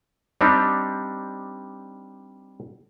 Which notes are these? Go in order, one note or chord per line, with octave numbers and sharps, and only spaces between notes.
G3 C4 D4 D#4 G4